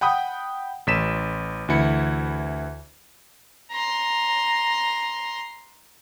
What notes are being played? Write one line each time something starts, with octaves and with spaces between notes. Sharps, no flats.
F#5 G5 B5 D#6 G6
A1 B6 E7
D2 E3 E4 C#7
A#5 C6